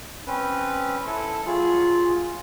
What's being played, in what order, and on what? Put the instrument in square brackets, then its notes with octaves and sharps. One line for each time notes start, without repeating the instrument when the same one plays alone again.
[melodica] C4 C#4 B4
E4 A4
[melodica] F#3 G#4 [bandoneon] F4